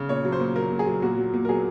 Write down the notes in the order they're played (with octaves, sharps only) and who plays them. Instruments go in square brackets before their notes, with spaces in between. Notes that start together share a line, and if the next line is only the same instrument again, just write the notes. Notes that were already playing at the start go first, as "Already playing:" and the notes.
Already playing: [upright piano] C#3
A#2 C#5
F#3
C5
A#2
F#3 A#4
A#2
G#4
F#3
A#2 F#4
F#3
A#2
A#4
F#3 G#4